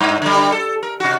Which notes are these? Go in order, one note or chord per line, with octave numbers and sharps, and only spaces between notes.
G2
D3 G3
A4
A#4
C3 F#4